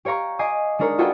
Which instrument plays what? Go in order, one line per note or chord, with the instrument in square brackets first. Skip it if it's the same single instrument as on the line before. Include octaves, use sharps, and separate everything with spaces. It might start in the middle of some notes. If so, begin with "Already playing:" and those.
[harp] G4 C#5 F5 A#5 C#6
D#5 G#5 D6 A#6 C7
G#3 D4 D#4 A#4 C#5
F4 F#4 G#4 A4 B4 G5